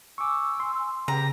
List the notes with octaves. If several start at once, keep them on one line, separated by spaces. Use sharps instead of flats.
G#5 C#6 D6 E6
C6
C#3 G4 B4 G5 A#5